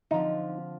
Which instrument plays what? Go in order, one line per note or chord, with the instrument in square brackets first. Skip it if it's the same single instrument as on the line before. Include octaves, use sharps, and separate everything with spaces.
[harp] D3 F3 C4 F4 [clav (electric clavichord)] D#4